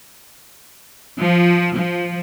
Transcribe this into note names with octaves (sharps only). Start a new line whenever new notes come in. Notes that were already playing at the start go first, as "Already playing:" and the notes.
F3
F3